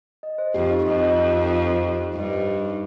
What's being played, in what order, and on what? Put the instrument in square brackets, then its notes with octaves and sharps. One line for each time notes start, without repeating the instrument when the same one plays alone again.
[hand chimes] D#5
C5
[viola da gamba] F2 [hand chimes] G4
[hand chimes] D#4
[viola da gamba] F2 [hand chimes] D#5
[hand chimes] C5
G4
D#4
D#5
C5
G4
D#4
[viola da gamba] G2 [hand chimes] D#5
[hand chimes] C5
G4
D#4